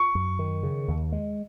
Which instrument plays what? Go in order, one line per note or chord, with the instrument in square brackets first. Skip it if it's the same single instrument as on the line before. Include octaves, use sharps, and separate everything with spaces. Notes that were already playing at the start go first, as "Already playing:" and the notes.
Already playing: [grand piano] C#6
[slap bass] F#2
D#3
C#3
D#2
G#3